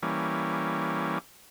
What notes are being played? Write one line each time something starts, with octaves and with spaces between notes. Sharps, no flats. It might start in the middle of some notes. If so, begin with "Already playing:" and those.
E3 G3 A#3 C#4